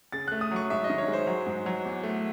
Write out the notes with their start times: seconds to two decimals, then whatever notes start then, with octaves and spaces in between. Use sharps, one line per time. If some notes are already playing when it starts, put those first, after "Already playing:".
0.12 C#3 A6
0.28 A3 F#6
0.41 D#6
0.51 F#3 C#6
0.70 G#2 E5
0.84 D#5
0.90 D#3
0.98 C#5
1.08 G#3
1.13 C5
1.27 F#3
1.46 G#2
1.66 F#3
1.85 E2
2.03 A3